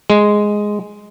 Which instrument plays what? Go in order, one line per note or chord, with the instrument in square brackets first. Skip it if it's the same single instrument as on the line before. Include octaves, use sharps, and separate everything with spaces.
[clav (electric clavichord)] G#3